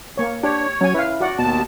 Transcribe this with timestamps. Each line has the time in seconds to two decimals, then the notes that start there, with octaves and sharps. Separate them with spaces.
0.17 A#3 C#5
0.43 D4 G4 C#5
0.81 F#3 C#4 G#5
0.94 E4 B4 F5
1.20 F#4 D5 F#5
1.39 D#2 B2 A5